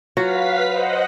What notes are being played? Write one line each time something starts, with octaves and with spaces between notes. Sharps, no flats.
F#3 F4 F#4 B4 F5 B6
C5 D#5 F#5